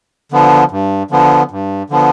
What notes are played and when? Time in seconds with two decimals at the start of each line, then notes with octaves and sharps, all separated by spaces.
0.32 D3 F3 B3
0.71 G2
1.11 D3 F3 B3
1.51 G2
1.90 D3 F3 B3